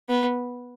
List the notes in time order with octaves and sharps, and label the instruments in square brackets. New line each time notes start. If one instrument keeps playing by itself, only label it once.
[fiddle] B3